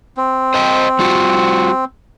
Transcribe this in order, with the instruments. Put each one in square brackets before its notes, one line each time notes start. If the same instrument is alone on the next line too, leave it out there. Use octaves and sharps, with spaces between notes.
[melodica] C4
[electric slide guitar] C5 D#5 G5
G3 F4 F#4